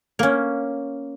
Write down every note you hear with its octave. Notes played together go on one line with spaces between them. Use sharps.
A#3 C#4